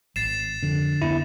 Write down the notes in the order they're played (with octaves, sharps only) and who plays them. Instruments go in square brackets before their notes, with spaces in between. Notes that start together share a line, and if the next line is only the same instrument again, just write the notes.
[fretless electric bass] G#1 [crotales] A6 C7 E7
[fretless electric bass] F2 [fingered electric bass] D3
[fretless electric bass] F2 B3 [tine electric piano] E4